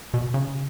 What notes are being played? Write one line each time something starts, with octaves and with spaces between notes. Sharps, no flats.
B2
C#3